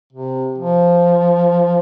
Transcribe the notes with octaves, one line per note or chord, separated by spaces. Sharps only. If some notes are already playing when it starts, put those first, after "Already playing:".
C3
F3